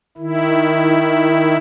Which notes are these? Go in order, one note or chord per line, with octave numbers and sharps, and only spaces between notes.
D#3 E4